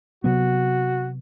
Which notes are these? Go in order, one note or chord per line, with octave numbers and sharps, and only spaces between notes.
C3 F#3 B3 F#4